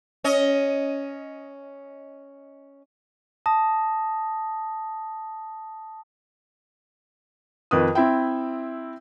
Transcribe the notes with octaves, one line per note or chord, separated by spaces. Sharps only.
C#4 D#5
A5 D#6 A#6
F2 D#3 B4 D#6
C4 E4 E5 G5